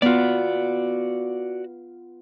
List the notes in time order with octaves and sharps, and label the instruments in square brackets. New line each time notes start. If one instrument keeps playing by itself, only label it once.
[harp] B3 F4 [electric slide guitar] F#4 D5